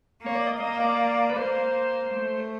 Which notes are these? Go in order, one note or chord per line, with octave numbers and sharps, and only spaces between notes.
A#3 C#5
D5
D#5
A#3 D#5
D5
B4
A#3 C5
A3